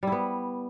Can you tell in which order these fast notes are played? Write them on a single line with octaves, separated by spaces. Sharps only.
G3 E4 B3